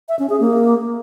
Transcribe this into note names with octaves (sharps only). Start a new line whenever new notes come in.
E5
C#4
G#4
A#3